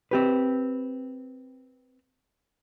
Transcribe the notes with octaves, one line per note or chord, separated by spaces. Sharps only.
C4 G4 B4